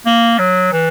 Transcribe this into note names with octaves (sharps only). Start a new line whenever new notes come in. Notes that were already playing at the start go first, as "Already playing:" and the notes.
A#3
F#3
E3